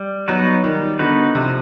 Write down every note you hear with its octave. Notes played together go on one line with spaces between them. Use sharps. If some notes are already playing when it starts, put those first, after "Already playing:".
Already playing: G3
F#3 B3 D#4 F#4 B4
D#3 G3
D3 B3 D#4 F#4 B4
C3 F3